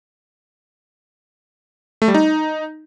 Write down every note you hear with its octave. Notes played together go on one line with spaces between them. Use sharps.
A3
G3
D#4